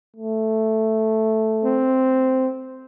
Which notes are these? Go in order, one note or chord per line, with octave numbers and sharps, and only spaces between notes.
A3
C4